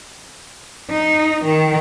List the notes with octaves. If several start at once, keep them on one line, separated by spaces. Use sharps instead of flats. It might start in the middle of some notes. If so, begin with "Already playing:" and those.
D#4
D#3